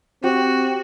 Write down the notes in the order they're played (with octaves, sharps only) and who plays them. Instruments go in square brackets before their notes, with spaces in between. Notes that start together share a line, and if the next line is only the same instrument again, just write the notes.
[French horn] C4 [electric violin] F#4 [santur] G4